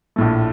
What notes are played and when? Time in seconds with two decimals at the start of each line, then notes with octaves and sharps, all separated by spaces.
0.16 A#1 A2 A3